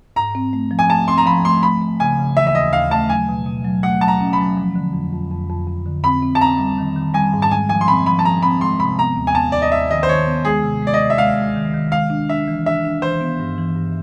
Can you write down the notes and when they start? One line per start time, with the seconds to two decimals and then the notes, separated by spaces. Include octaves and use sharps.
0.16 G#2 A#5
0.35 C4
0.53 A3
0.71 F3
0.79 G#5
0.90 A3 A5
1.08 C4 C6
1.18 A#5
1.26 F3 B5
1.44 A3 C6
1.63 A3 B5
1.81 A3
2.00 C#3 G#5
2.19 C#3
2.36 E3 E5
2.47 E5
2.55 D#2 D#5
2.73 D#2 F5
2.91 A3 A5
3.09 F#3 G#5
3.29 B2
3.46 B2
3.65 F#3
3.83 A3 F#5
4.01 F#3 A5
4.08 A#5
4.20 C#4
4.33 B5
4.39 F#3
4.57 F3
4.76 D3
4.93 F2
5.13 F2
5.31 F2
5.50 F2
5.67 F2
5.86 D3
6.04 C4 B5
6.22 C4
6.35 A5
6.41 C4 A#5
6.59 G3
6.78 D#3
6.96 D#3
7.14 G3 G#5
7.33 G#2
7.42 A5
7.51 G#3 G#5
7.69 F3 G#5
7.81 C6
7.88 C4 B5
8.06 F3 B5
8.19 A5
8.25 F3 A#5
8.42 C4 B5
8.61 G#3 C6
8.80 C3 B5
8.99 B3 A#5
9.16 D#2
9.27 G#5
9.35 B3 A5
9.52 D#2 D5
9.62 D#5
9.72 D#2 E5
9.90 D#3 D#5
10.03 C5
10.08 D#3 C#5
10.27 B3
10.45 G#3 G#4
10.63 C3
10.82 G#3 D5
10.94 D#5
11.01 C3
11.10 E5
11.18 G#3 F5
11.38 G#3
11.56 D#3
11.74 D#3
11.92 G#3 F5
12.10 D4
12.29 D4 E5
12.48 E3
12.66 D4 E5
12.85 D4
13.02 E3 C5
13.21 B3
13.40 G2
13.58 E3
13.77 G2